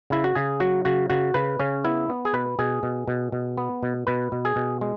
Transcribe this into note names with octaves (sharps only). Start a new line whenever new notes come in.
C#3 E4
F#4
C#3 G#4
F#3 F#4
C#3 F#4
C#3 F#4
C#3 B4
C#3 C#4
B3 E4
B3
G#4
B2 B4
B2 G#4
B2
B2
B2
B3
B2
B2 B4
B2
G#4
B2
G#3